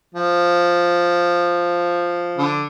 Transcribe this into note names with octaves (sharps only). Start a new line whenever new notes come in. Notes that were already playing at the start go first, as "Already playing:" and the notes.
F3
D3